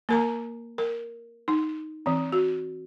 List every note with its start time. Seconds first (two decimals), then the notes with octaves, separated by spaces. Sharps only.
0.09 A#3 A#4 A#5
0.78 A#4
1.48 D#4
2.06 E3 C4
2.32 F#4